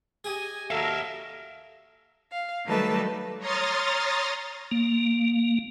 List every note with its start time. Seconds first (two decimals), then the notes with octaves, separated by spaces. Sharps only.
0.24 G4 G#4 D#5 G#5
0.71 D#2 F#4 A4 A#4 E5 F5
2.31 F5
2.66 D#3 F#3 G3 A3 B4 A5
3.39 C#5 A#5 C6 D#6 F6 A6
4.71 A#3